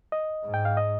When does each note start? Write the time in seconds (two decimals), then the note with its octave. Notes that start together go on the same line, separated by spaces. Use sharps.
0.12 D#5
0.44 G#2
0.54 G5
0.65 F5
0.77 D#5